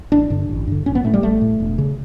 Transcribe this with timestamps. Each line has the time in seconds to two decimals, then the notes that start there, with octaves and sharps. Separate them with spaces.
0.12 A1 D4
0.30 G2 D3
0.49 A1
0.67 G2 D3
0.86 A1 C#4
0.95 B3
1.04 A2 A3
1.14 G3
1.23 A1 A3
1.41 A2
1.60 E1
1.78 C#3